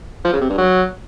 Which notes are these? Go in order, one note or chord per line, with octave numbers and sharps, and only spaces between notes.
F3
C#3
C3
G2
F#3